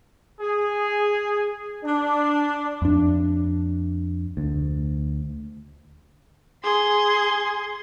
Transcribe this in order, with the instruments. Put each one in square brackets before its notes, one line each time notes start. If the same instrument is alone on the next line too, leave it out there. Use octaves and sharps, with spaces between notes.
[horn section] G#4
D4
[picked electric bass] F2 D4
D2
[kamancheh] G#4 C6